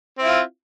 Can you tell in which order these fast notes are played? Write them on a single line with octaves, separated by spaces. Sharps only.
C4 E4 F4